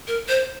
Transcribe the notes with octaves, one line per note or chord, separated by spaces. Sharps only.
A#4
C5